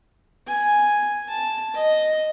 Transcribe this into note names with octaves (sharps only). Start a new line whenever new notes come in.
G#5
A5
D#5